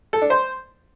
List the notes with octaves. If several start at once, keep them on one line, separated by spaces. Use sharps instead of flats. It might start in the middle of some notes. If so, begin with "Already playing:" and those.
A4
D4
C5